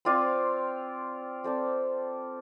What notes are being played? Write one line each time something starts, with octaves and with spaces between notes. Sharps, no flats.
C4 F4 D5 F5
C4 A4 D5